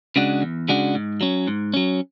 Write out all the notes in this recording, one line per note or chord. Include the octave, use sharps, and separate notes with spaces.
C#3 G#3 D4 F#4
E2
C#3 G#3 D4 F#4
G#2
F#3 C#4
G#2
F#3 C#4